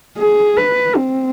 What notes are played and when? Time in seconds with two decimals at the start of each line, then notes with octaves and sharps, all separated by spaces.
0.18 G#4
0.57 B4
0.96 C4